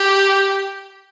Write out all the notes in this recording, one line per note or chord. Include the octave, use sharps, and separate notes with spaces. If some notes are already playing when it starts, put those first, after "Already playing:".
Already playing: G4